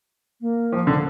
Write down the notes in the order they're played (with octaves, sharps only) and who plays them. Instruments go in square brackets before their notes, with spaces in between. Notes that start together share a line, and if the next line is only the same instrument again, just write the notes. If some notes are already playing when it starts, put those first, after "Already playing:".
[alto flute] A#3
[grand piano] F3
D3